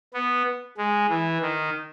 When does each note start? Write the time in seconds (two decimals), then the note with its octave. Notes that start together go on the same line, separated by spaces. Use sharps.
0.14 B3
0.77 G#3
1.09 E3
1.41 D#3